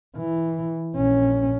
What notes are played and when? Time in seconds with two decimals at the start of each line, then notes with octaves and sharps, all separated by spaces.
0.17 E3
0.96 A#1 C#4